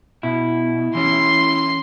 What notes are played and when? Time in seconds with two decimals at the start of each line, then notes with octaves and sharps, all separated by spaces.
0.23 B2 E4
0.95 E3 C#4 C6 C7